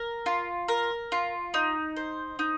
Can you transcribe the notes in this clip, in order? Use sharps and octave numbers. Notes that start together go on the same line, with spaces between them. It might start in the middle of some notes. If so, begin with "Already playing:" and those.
Already playing: A#4
F4
A#4
F4
D#4
C5
D#4